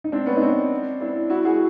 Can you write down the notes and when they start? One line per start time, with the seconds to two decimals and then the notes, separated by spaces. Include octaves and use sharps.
0.04 D#4
0.12 C4 D4
0.26 B3 C#4
0.37 D#4
0.41 C4 D4
1.00 D4 E4
1.30 E4 F#4
1.45 F#4 G#4